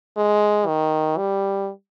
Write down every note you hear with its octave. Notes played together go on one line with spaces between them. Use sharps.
G#3
D#3
G3